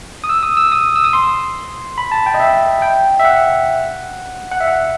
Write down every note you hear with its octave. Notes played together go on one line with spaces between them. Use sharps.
D#6
E6
D#6
E6
D#6
E6
D#6
C6
B5
A5
G5
D#5
E5
G5
E5
F#5
F#5
E5
F#5